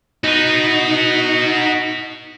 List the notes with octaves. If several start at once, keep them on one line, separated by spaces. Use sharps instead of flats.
D#4 F#4 B4